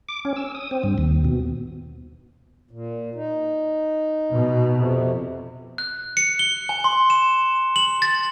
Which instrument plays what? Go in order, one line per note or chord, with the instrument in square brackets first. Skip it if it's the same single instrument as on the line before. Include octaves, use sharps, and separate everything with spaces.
[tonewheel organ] D6
C#4
E6
D#6
C4
G2
D#2
B2
[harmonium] A#2
D#4
[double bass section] B2
[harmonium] F2 C3
[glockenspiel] F#6
C#7
G7
G#5
C6
E7
F#7
A6